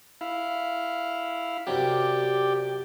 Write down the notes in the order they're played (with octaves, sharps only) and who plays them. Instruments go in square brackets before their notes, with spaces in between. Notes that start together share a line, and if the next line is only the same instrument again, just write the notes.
[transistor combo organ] E4 F5
[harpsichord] F#2 C3 F#3 [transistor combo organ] G4 D5